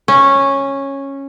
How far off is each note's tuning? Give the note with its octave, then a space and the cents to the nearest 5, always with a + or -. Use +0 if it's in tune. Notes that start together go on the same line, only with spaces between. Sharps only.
C#4 -10